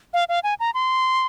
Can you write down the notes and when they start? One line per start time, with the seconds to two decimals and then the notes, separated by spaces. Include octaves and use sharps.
0.14 F5
0.29 F5
0.44 G#5
0.60 A#5
0.74 C6